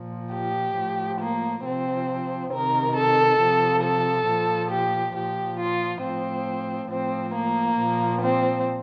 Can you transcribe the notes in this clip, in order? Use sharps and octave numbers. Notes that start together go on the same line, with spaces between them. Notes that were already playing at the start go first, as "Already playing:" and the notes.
Already playing: A#2 F3
G4
A2 F3
A#3
C3 F3 C4
C3 D#3 A#4
A4
C3 F3
A4
A#2 F3
G4
A#2 F3 G4
F4
A2 F3 C4
A2 F3 C4
A#3
A#2 F3
C4